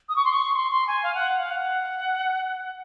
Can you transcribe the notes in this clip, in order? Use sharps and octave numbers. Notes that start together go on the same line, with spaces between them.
D#6
C#6
C6
C#6
C6
C6
G#5
F5
F#5
F5
F#5